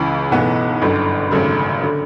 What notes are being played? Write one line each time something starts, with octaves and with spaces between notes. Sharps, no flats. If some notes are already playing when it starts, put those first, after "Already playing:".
Already playing: C#2 C#3 E3
B1 A2 E3 B3
G1 F#2 D3
G#1 F#2 C#3 A3
D3